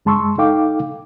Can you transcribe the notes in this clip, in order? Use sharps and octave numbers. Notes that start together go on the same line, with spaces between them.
F#2 G#3 A5 C6 C#6 E6
D#4 A4 F5 G5 D6